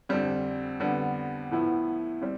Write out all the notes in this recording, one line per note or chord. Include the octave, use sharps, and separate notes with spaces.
F2 D3 G3 C4
F2 D3 G3 B3
A2 F3 B3 E4
G3 C4